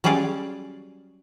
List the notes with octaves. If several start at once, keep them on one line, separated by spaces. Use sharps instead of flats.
F#3 G3 C#4 G#4 D5 F5